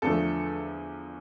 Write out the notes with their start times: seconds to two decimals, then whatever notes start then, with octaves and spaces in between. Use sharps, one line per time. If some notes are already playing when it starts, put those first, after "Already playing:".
0.02 E2 D3 F3 A3 A4